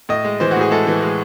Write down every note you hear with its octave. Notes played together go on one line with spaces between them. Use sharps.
A2 D#5
G#3
E3 C5
F#4
A2 G#4
G#3 A4
E3
G#3